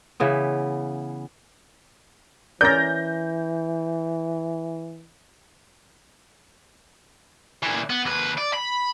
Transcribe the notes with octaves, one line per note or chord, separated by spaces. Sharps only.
C#3 E3 B3
E3 C#4 A#4 D5 G6 A#6
A#2 E3
B3
D#2 B4
D5
B5